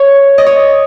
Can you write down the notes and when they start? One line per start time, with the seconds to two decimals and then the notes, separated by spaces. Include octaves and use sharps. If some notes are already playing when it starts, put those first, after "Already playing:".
Already playing: C#5
0.38 D#5
0.46 C#5